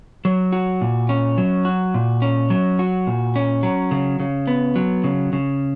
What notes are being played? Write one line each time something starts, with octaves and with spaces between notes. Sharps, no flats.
F#3
F#4
A#2
C#4
F#3
F#4
A#2
C#4
F#3
F#4
A#2
C#4
F#3
C#3
C#3
B3
F#3
C#3
C#3